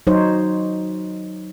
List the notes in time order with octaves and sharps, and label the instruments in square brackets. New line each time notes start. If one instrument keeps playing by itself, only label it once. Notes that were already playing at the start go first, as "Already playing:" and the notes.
[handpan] F#3 D#4 C5 C#5